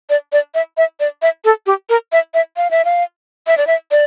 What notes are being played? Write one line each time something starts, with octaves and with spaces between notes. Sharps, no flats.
D5
D5
E5
E5
D5
E5
A4
G4
A#4
E5
E5
F5
E5
F5
E5
D5
E5
D5